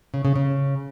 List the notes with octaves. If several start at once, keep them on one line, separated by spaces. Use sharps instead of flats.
C#3
C#3
C#3